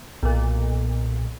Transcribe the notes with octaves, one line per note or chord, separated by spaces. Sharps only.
B1 A#2